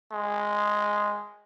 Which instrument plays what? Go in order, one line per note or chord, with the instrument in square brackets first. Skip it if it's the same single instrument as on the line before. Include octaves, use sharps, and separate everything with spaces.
[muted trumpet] G#3